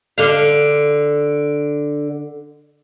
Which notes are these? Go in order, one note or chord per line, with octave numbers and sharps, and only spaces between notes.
D3 F5